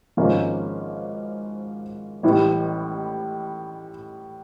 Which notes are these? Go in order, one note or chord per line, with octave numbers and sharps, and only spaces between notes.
G#1 G#2 F3 A#3 C#4
A1 A2 E3 G3